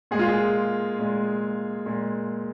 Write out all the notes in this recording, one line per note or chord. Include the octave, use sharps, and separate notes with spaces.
A#2 G#3 G#4
F4
G#4
A#2 G#3
A#2 G#3